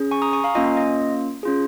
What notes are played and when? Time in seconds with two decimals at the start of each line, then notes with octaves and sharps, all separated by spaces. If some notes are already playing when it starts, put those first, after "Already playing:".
Already playing: C#4 G#4
0.11 G#5 C#6
0.22 A#5 D#6
0.33 G#5 C#6
0.44 F5 A#5
0.55 A#3 C#4 F4 D#5 G#5
0.77 D#5
1.43 C#4 F4 G#4